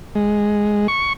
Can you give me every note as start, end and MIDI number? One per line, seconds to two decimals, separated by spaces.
0.15 0.87 56
0.88 1.13 85